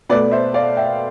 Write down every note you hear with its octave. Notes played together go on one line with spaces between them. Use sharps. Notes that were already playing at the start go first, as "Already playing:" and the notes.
B2 A3 B4 D5
C5 E5
D5 F5
E5 G5